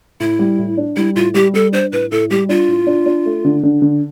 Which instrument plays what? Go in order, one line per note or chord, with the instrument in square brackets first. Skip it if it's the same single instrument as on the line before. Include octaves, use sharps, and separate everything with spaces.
[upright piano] A2 [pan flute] E4
[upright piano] G3
A2
D4
[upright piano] G3 [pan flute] E4
[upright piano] A2 [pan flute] F4
[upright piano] G3 [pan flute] G4
[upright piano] G3 [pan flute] A4
[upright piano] D4 [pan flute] C5
[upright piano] A2 [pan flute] B4
[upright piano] A2 [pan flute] A4
[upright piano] G3 [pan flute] G4
[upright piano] D4 [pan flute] F4
[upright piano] A2
D4
D4
A3
D3
D3
D3